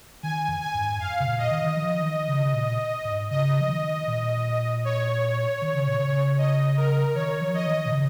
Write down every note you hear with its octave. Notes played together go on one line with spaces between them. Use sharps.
D#3 G#5
F2
G#5
G#2
F2 F5
C#3
A#2
D#5
D#3
D#3
F3
D#3
C#3
C#3
A#2
G#2
C#3 D#5
F3
D#3
A#2
C#5
D#3
C#3
A#2
C#3
D#5
A#4
D#3 C#5
F3
D#5
D#3
A#2
C#3